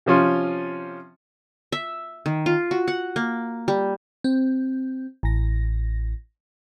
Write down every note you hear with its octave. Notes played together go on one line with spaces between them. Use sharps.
C3 F3 C#4 F4
E5
D#3
F4
F#4
F#5
A#3
G3
C4
A1 A#6